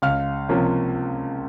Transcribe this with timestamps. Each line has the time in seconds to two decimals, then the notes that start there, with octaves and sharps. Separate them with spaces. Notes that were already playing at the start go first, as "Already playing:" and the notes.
0.02 C#2 F5 F6
0.49 C3 F3 A#3 C#4